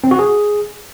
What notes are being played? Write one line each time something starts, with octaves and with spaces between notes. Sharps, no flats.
C4
F#4
G#4